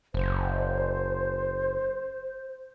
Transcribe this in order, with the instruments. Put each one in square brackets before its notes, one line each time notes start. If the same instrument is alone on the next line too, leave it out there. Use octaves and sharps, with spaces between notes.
[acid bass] F#1 [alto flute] C5